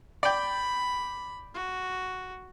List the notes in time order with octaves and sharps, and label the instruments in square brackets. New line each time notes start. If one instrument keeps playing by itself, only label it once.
[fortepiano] D5 G5 [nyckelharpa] B5
[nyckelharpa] F#4